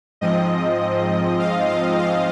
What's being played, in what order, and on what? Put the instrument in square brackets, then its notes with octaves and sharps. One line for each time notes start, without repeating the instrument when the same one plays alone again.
[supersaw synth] G#2 F3 C4 D#5
F5
F5
F5